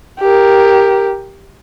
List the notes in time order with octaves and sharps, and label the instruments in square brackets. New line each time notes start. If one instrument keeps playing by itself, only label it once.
[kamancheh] G4 A#4